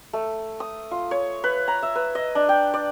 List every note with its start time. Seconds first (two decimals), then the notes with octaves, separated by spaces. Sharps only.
0.13 A3
0.60 D#6
0.91 F4
1.11 C#5
1.44 B4
1.68 A#5
1.83 E5
1.95 B4
2.15 D#5
2.35 D4
2.49 G5
2.74 D5